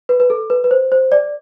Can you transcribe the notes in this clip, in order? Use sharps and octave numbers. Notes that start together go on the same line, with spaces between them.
B4
B4
A4
B4
B4
C5
C5
D5